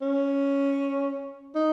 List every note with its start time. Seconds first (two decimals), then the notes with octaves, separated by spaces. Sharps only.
0.02 C#4
1.55 D#4